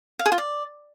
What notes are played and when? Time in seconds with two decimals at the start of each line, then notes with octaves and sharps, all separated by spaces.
0.19 F5
0.26 G#4
0.32 F4
0.38 D5